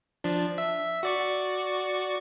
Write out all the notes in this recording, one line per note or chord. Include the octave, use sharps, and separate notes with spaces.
F3 D4
E5
F#4 D5 C#6